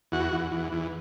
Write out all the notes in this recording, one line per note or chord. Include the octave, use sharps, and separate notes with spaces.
E2 F#4
E2
E2
E2